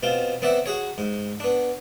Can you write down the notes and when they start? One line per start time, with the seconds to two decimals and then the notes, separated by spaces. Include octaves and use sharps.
0.03 B2 C4 F4
0.42 B3 C4 D5 E5 F#5
0.66 F#4 G#4 C#5
0.98 G#2
1.40 B3 D4